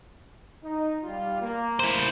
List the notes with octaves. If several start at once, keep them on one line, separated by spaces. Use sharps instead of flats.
D#4
G3 F4
A#3
E4 C5